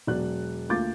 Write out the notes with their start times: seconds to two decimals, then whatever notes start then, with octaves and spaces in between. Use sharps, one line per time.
0.07 E1 F#3 D5 F#6
0.69 D2 A#3 F4 D6 G6 A6